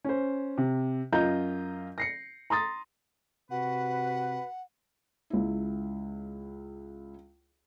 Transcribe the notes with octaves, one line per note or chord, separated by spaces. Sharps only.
C#4 C5
C3
F#2 F4 D#5 A#5 G6
A#6 C7 C#7
A#5 C6 D#6 A6
C3 F#4 B4 F#5
C#2 E4